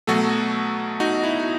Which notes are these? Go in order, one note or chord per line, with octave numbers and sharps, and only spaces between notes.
B2 F#3 A3 F#4 A4
D#4 F#4
E4
F#4